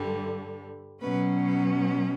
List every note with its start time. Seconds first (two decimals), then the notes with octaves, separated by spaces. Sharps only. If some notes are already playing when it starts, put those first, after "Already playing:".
Already playing: G2 D3 G3
1.01 B2 F#3 C#4 B4
1.46 B4